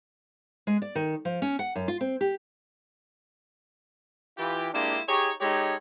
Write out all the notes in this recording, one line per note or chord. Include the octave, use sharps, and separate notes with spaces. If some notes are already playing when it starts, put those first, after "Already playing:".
G#3
D5
D#3
F3
C#4
F#5
F#2
F4
C4
G4
E3 F4 G4
G#3 A#3 D4 E4 F4 G4
D#4 G4 G#4 C#5
G#3 D#4 G4 A4 C#5